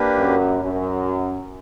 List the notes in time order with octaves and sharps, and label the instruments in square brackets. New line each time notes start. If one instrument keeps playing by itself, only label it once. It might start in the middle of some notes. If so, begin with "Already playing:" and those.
Already playing: [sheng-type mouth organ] A#3 D4 G4 B4
[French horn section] F#2
F#2